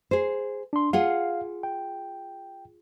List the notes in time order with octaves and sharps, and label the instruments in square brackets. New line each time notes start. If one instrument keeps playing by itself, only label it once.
[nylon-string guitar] G#4 C5
[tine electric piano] D4 C6
[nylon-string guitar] F4 G#4 F#5 [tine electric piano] F5
[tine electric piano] G5